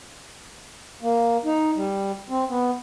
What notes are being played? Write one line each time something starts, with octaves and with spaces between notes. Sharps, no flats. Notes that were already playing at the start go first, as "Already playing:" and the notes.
A#3
D#4
G3
C4
B3